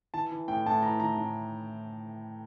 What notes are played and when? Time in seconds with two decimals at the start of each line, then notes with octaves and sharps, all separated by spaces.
0.14 E3 A5
0.31 E3
0.48 A2 G5
0.66 A2 A5
0.83 E3 A#5
1.00 E3 A#5
1.17 A2